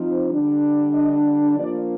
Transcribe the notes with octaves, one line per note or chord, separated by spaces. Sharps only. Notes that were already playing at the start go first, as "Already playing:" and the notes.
Already playing: F3 C4 D#4
D3 G3 D4
D#5
F3 A#3 D4 D5